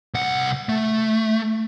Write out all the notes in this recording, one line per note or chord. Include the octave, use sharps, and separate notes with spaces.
C2 F#5
A3